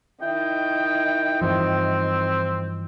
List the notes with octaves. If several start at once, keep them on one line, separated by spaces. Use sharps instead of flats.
D#3 E4 G5
G2 E3 F3 C4